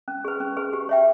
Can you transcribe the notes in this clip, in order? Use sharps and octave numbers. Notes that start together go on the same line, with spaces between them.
C#4
G#4 B4
C#4
G#4 B4
G4
C#5 E5 G5